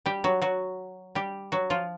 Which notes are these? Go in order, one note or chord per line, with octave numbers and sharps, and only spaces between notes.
G3 G4
F#3 F#4
F#3 F#4
G3 G4
F#3 F#4
F3 F4